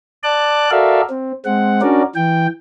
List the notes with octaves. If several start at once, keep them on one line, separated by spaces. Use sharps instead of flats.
D5 A5 D6 F#6
F#4 A4 A#4 D5 E5 F5
C4
G#3 C4 F#5
C#4 D4 F#4 A#4 D5
E3 G5